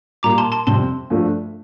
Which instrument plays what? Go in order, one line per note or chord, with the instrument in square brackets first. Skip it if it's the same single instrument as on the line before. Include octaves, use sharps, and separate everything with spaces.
[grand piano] A#2 G3 A#3 [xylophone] A#5 D6
[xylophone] A5 C6
A5 C6
[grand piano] F2 C3 G3 C4 [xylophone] A5 C6
[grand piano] G2 F3 A3 D4